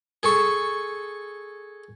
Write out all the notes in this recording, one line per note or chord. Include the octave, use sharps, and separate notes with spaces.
G#4 A4 C#6